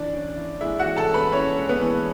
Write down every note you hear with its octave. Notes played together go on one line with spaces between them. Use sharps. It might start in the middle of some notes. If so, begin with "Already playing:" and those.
Already playing: E3 D4 D5
C#4
E4
G#3 E4 E5
F#4 F#5
E3
A4 A5
C#4
B4 B5
C#4 E4 C#5
G#3
B3 B4
E3